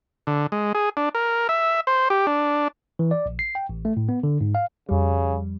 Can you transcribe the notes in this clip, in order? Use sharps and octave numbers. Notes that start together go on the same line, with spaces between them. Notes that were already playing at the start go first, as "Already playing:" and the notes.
D3
G#3
G#4
D4
A#4
E5
C5
G4
D4
E3
D5
A#1
C7
G5
A1
A3
A2
B3
D3
G#2
F5
F2 C#3 G3